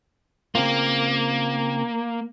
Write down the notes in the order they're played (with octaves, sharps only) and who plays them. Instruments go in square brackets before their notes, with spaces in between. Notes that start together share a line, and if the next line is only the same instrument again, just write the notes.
[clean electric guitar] C#3 C4 F4 [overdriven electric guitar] A#3